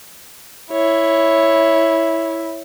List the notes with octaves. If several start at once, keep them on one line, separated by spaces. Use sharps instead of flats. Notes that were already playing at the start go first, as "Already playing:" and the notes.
E4 C#5